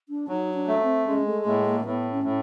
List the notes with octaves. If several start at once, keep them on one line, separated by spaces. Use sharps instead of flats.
D4
F#3 D#4
D4
A3
C4
G#3 C#4
A3
A2 A#3
A#3
A2 B3
C#4
A2